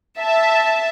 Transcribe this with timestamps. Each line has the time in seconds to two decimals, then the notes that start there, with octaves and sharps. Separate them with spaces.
0.18 E5 A5